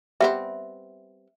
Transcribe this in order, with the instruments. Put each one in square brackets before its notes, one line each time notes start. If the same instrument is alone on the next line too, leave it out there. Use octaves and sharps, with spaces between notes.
[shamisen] G3 B3 C4 [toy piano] E5